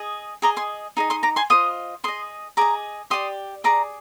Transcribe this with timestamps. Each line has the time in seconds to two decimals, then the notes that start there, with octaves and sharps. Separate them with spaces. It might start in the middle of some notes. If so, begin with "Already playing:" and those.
Already playing: G#4 D#5
0.42 G#4 D#5 A#5 D6
0.56 G#5 C6
0.97 D#4 G#4 D#5
1.10 C6 D#6
1.23 A#5 D6
1.36 G#5 C6
1.50 F4 C5 D#5 C6 D#6
2.04 G#4 D#5 C6 D#6
2.57 G#4 D#5 A#5 D6
3.10 G4 D5 C6 D#6
3.64 G#4 D5 A#5 D6